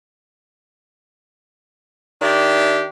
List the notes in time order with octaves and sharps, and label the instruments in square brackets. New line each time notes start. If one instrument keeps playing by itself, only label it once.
[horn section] D#3 D4 G4 E5